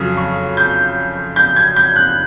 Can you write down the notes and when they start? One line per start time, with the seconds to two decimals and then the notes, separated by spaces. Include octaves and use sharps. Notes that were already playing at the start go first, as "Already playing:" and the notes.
Already playing: F2 C#3 F#3
0.17 C#6
0.57 G6
1.36 G6
1.56 G#6
1.76 G6
1.96 F#6